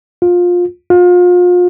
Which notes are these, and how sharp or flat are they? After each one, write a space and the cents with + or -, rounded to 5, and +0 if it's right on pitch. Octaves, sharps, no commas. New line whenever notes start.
F4 +20
F4 +35